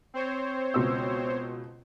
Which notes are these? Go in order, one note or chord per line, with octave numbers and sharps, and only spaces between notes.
C4 C5 C#5
C#2 B2 E6